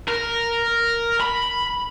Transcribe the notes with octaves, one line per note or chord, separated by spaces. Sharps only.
A#4
B5